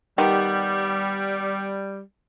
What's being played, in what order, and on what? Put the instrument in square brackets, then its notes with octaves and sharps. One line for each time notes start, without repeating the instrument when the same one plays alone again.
[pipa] D#3 B3 [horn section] G3